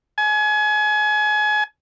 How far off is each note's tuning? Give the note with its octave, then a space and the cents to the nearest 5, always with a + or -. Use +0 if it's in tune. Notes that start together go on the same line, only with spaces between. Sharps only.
G#5 +30